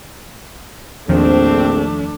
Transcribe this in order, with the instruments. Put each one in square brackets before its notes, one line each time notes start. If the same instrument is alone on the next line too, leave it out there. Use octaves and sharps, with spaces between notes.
[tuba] A#1 [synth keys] E2 D#3 F3 [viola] A3 D4 [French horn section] C4